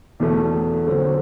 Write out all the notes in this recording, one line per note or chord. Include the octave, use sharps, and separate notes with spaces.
E2 B2 A3
D3 F#3 C4